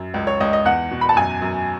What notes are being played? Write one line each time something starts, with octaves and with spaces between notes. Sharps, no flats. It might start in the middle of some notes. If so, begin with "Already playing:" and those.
Already playing: F#2
C#2
C#5
C#2 D#5
D#5
E2 F#5
B2
B5
A5
F#2 G#5
F#2